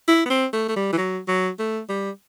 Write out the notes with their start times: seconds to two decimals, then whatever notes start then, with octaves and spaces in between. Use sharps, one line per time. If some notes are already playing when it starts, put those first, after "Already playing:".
0.08 E4
0.26 B3
0.30 C4
0.53 A3
0.69 A3
0.76 G3
0.93 E3
0.98 F#3
1.28 F#3
1.59 A3
1.89 G3